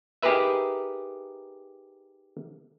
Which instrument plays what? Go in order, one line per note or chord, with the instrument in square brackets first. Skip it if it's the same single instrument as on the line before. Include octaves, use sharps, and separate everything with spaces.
[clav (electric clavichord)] D#4 G4 G#4 A#4 B4 E5